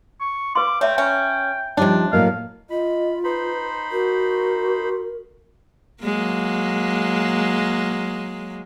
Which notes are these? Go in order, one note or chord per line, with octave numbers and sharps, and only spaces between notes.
C#6
B4 F5 C6 D6
A3 C#5 E5 G5 A5
C#4 E5 A#5
C3 F3 G3 D4 D#4 C#5 A5
A2 F#3 A#3 D#5 F5
F4 D#5 B5
D#4 B4 C5 B5
F#4 A#4
F#3 G#3 A#3